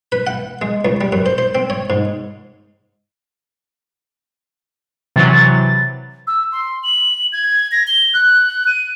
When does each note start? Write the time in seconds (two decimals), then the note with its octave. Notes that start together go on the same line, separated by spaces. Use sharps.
0.12 B4
0.27 F#5
0.62 G#3
0.85 C#2
1.01 G3
1.12 F#2
1.26 C5
1.38 C5
1.55 C4
1.70 C#5
1.90 G#2
5.16 C3 E3 F#3 A6
6.27 E6
6.52 C6
6.83 F#7
7.32 G#6
7.71 A#6
7.87 G7
8.14 F#6
8.67 D#7